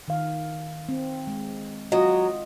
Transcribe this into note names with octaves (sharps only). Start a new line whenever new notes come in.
D#3 F5
C4
G#3
F#3 F4 D#5